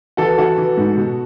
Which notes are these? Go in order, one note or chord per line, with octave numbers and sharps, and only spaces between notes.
E3 F#4 A4
E3 F#4 A4
E3
G#2
B2